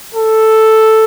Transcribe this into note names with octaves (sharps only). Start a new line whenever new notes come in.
A4